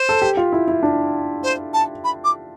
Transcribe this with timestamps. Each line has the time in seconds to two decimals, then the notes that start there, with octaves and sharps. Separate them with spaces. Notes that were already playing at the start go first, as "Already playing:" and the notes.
Already playing: C5
0.09 A4
0.22 G4
0.37 F4
0.52 E4
0.68 E4
0.83 D4
1.43 C5
1.74 A5
2.04 B5
2.24 D6